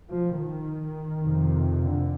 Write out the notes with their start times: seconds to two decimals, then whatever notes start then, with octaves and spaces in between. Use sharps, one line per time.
0.11 F3
0.39 D#3
1.24 F2 C3
1.82 D3